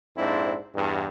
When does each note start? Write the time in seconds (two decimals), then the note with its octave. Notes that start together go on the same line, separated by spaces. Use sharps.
0.17 A#1 F2 G#2 C4 D4 E4
0.76 E2 G2